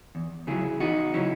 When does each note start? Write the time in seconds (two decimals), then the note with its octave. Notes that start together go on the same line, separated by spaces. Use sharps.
0.15 E2
0.47 C#3 F#3 E4 G#4
0.80 E2 D#4 F#4
1.14 C#3 F#3 C#4 E4